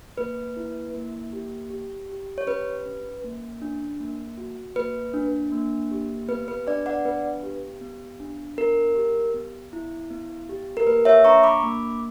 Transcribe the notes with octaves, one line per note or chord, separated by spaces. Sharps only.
A#3 B4
E4
A#3
G4
G4
G4
C#5
C#4 B4
C#4
A#3
D4
A#3
F#4
A#3 B4
D4
A#3
G4
B3 B4
B4
D4 B4 D5
D5 F#5
B3 B4
G4
B3
D4
B3 A#4
G4
B3
E4
B3
G4
A#4
A#3 B4
C#5 E5
D4 A#5 C#6
B5 D6
A#3